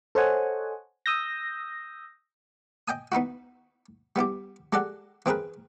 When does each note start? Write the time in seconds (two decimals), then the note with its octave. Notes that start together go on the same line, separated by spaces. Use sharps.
0.15 A4 C5 C#5 D#5 F#5 G#5
1.06 D#6 E6 G6 A#6
2.88 D#5 G5 G#5 D#6
3.12 B3 D#4 E4 F#4
4.16 G3 B3 E4 G4
4.73 G#3 G4 A4 D5 F#5
5.26 E3 C4 G#4 A#4 B4